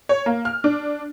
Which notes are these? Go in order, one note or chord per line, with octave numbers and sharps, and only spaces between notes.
C#5
A#3
F6
D4